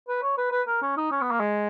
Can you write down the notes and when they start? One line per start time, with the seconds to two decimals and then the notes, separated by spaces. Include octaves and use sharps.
0.08 B4
0.22 C#5
0.38 B4
0.52 B4
0.67 A#4
0.82 C#4
0.97 D#4
1.11 C#4
1.21 B3
1.31 A#3
1.40 G#3